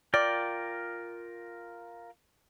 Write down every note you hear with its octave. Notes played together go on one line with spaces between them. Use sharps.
F4 A#4 D5 G5